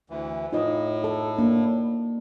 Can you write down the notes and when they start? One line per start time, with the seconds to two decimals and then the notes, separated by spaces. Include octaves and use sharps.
0.10 D2 E3
0.53 A2 D#4 F4 D#5
1.04 A4
1.38 A#3 D4